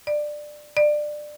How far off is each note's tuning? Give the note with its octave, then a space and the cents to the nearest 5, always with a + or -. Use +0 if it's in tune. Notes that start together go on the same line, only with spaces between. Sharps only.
D5 +15
D5 +20